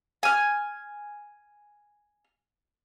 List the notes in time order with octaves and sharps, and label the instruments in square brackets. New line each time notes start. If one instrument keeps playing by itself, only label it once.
[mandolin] G#5 F6